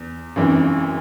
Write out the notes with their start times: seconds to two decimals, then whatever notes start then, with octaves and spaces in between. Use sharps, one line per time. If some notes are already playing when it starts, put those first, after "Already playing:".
Already playing: E2
0.36 G#1 F#2 E3